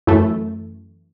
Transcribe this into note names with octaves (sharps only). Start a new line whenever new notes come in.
F#2 E3 A3